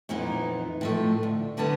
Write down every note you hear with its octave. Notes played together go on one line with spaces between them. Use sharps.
F2 A#2 E3 B3 D#4
A2 F3 A3
D2
A2 D3 G3 B3 A5